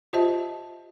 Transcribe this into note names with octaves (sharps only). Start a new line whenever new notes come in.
F4 G4 C5 D#5 E5 A5